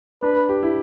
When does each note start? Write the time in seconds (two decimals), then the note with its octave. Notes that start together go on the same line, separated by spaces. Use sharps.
0.22 D4 B4
0.49 G4
0.63 E4